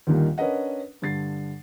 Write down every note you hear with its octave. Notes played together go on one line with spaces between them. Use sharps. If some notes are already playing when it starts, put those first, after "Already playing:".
D#2 A#2 D3 D#3 G3 A#3
C#4 D4 A#4 B4 D#5 F#5
G2 D3 A6 C7